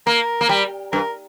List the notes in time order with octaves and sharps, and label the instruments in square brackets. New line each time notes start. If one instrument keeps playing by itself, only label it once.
[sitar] A#3 [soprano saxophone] A#4
[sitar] A#3
G3
[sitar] G2 [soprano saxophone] A#4